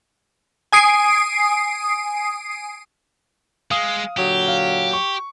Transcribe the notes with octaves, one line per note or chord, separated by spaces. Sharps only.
G#5 D#6 C7 D7
G#3 F5 D#6
A#2 D3 F#3 G4
F5
C#6